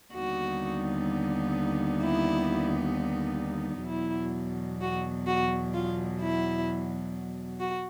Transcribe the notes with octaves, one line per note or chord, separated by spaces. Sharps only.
D#2 D3 G3 B3 D#4 F#4
E4
E2 B2 F#3 E4
F#4
F#4
F4
E4
F#4